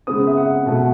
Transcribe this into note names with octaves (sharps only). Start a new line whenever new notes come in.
C#3 G#3 B3 D#6
E5
F#5
B2 A3 F#5